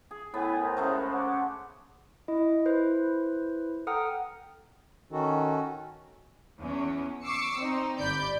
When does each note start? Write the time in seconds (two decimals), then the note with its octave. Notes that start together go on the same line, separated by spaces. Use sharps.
0.11 G#4
0.34 A2 B3 E4 G#5
0.58 A#4 C5
0.77 C#3 G#3 A3
1.12 C#5 F#5 D6
2.28 E4 D#5
2.66 E4 B4 C5
3.87 A4 F#5 G5 A#5 D#6 F6
5.12 D#3 C#4 F#4 A4
6.59 E2 C#4
7.23 C#6 D6 E6 C7 C#7
7.59 C4 D#4
7.99 G1 D5 B5 G6